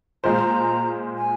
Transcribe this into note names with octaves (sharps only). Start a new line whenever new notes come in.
A#2 G#3 F4 C5 A#5
G#5